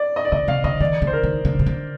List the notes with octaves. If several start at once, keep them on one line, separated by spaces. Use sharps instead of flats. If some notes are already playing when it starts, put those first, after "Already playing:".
Already playing: D5
D#5
D5
D3 D#5
C3 F5
D3 D#5
D#3 D5
D3
C5
A#4
D#3
D3
C3
D3